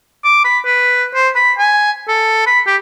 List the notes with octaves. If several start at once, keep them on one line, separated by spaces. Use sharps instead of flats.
D6
B5
B4
C5
B5
G#5
A4
B5
G4